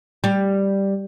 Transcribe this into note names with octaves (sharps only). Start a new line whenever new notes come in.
G3